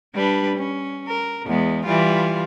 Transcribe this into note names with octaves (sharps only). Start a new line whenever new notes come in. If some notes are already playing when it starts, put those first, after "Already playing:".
G3 D4 B4
C#4
A#4
E2 G#3 B3
E3 G3 F4